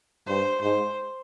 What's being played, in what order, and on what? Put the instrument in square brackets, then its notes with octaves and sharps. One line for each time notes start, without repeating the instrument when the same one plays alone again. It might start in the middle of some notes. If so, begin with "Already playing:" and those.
[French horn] G2 [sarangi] C5
[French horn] G#2 [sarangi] C5